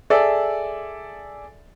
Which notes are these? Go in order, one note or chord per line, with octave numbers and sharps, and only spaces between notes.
G#4 A4 D5 E5